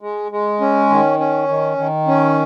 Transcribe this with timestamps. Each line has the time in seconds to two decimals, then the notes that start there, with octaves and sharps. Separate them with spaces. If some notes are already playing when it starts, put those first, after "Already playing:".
0.01 G#3
0.32 G#3
0.61 C#4
0.90 D#3
1.19 C#4
1.48 D#3
1.77 D#3
2.07 C#4